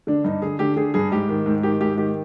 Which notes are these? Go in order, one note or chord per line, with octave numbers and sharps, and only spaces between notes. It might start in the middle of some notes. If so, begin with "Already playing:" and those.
D3 D4
G2 D#4
D3 G#4
D3 G4
D3 G#4
G2 G#4
G#2 G4
D#3
G#2
D#3 G4
G#2 G4
D#3 G4